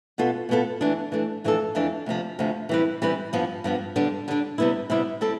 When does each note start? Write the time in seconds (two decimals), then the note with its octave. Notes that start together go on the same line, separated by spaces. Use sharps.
0.18 B2 B3 F4 A4
0.49 B2 B3 F4 A4
0.81 E3 A3 D4
1.12 E3 A3 D4
1.44 F2 E3 A3 D4 A4
1.75 F2 E3 A3 D4 A4
2.06 D2 C3 F3
2.39 D2 C3 F3
2.69 E3 G3 C4 E4 B4
3.02 E3 G3 C4 E4 B4
3.33 G2 F3 B3
3.64 G2 F3 B3
3.96 D3 G3 B3 D4
4.28 D3 G3 B3 D4
4.58 C3 G3 B3 E4
4.90 C3 G3 B3 E4
5.21 G3 C4 E4 A4